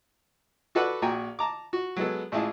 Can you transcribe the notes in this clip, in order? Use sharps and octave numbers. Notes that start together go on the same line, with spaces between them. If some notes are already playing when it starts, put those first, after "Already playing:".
F#4 A4 B4 D5 F#5
A#1 F#4 G5 G#5 A#5
A5 A#5 D6
F#4
F#3 G#3 B3 A4
A1 G#3 E4 F4 G#4 A5